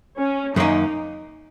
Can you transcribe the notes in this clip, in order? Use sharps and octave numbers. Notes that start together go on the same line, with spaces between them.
C#4
F#2 D#3 A#3 C#4 D#4